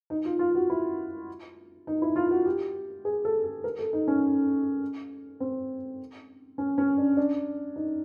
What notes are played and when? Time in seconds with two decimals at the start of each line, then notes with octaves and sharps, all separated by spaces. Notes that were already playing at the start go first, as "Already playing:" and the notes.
0.10 D#4
0.25 F4
0.39 F4
0.55 F#4
0.70 E4
1.87 D#4
2.02 E4
2.16 F4
2.31 F#4
2.46 G4
3.05 G#4
3.25 A4
3.44 A4
3.64 A#4
3.79 A4
3.93 D#4
4.08 C#4
5.40 C4
6.58 C#4
6.78 C#4
6.98 D4
7.17 D4
7.76 D#4